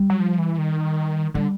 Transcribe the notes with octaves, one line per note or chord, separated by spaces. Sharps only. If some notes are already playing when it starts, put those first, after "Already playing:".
Already playing: G3
F#3
F3
E3
D#3
D3 G3